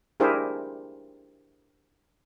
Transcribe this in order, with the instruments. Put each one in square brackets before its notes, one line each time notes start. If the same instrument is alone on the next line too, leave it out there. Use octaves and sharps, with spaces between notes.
[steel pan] D4 E4 G4 G#4 A#4 C5